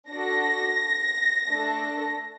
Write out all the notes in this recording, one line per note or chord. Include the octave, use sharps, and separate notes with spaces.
D4 F#4 A4 A#6
A3 D4 A4